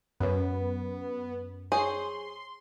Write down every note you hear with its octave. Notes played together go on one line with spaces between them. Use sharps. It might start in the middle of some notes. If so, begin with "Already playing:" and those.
F#2 B3
G#4 C5 C#5 C6